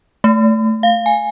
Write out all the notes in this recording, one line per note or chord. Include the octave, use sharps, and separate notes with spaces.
A3
F5
G#5